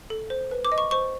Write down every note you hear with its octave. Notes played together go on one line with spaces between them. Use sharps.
A4
C5
B4
D6
D#5
C#6
C5 C#6